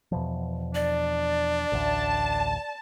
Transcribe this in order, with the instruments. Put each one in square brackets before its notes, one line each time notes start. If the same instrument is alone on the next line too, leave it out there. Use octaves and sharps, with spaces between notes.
[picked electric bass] E2 B2 F3
[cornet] D4 [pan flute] D5
[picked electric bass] A1 D2 [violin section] A5